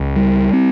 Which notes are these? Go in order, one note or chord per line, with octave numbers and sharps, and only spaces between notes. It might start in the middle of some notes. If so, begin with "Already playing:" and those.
Already playing: C#2
G3
C4